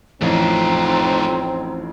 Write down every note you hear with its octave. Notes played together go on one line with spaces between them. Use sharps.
A1 F2 A3 C4 D#4 F4